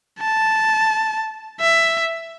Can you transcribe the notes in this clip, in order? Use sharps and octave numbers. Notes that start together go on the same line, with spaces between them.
A5
E5